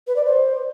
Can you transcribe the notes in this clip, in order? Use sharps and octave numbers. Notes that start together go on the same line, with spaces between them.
B4
D5
C5